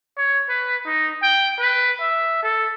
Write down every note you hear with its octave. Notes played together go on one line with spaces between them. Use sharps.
C#5
B4
D#4
G5
B4
E5
A4